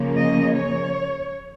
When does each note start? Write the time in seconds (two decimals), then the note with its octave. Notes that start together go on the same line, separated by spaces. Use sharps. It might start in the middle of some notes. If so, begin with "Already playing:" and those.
Already playing: C#3 F3 A#3 C#4
0.16 D#5
0.52 C#5